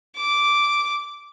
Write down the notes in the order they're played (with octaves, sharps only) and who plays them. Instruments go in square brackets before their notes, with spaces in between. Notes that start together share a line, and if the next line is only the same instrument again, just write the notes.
[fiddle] D6